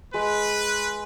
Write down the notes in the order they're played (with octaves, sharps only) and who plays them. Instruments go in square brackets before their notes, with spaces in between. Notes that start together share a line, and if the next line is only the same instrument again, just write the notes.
[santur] G#3 [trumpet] B4